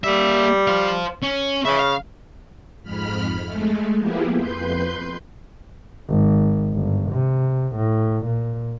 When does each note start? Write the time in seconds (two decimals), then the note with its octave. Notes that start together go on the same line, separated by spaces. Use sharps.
0.04 G3 A#3 E5
0.67 C5 F5
1.22 C#4
1.65 C#3 E5 G#5
1.79 F5
2.83 F2 G#2 B5 F6
3.45 G#3 A3
3.97 F3 A#3 B3 E4 G4 G#4
4.35 F2 B4 C6 G6
6.08 G#1
6.73 G1
7.12 C3
7.75 A2
8.26 A#2